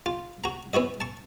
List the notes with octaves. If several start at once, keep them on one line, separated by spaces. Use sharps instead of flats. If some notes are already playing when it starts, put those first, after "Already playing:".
F4
F#4 A#5
B3 E4 F#4 D#5
A5 C#6